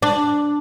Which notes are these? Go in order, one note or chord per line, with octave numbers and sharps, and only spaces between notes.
D4